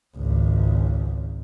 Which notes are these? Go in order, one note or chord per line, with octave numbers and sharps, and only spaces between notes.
G#1 C#2